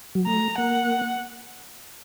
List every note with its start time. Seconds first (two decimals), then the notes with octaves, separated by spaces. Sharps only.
0.15 F#3
0.26 A3 A#5
0.58 A#3 F#5